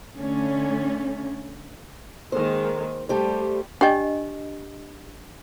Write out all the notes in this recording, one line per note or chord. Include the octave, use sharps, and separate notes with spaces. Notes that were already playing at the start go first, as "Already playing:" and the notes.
D3 A3 C#4
D#3 G#3 A#3 C5
G3 A3 G4 C5
D4 G4 D5 D#5 G5